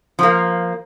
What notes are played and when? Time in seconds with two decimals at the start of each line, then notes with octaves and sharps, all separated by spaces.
0.19 F3 A#3